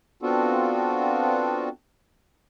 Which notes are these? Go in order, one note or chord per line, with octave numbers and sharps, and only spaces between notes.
B3 C4 D4 F4 F#4 A4